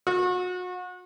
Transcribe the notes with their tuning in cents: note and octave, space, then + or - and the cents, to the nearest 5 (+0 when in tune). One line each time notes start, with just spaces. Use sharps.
F#4 -35